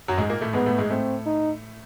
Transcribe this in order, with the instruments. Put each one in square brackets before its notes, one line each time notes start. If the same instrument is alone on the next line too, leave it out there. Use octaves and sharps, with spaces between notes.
[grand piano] F#2 F#3
G#2 G#3
A#2 A#3
A2 A3
[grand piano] G#2 G#3 [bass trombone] B3
[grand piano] A2 A3
G#2 G#3
[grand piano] A2 A3 [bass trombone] C4
[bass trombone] D#4